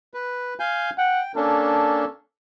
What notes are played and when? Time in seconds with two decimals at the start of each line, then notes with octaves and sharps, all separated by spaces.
0.14 B4
0.60 F5 G#5 G6
0.98 F#5 G5
1.36 A#3 C#4 D4 A4